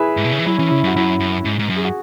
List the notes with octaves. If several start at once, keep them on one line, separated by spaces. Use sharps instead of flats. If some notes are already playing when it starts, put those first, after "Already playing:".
Already playing: E4 G#4 B4 E5
G#2
B2
C#3
E3
F#3 E4
E3 C#4
C#3 E4
F#2 F#4
F#2 E4
F#2
G#2
G#2
F#2
G#4
F#4